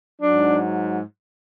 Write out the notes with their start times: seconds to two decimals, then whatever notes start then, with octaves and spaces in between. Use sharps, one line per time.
0.21 F#3 D4
0.27 G#2